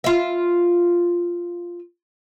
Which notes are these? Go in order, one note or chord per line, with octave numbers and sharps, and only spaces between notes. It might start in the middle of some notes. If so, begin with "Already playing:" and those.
F4 E5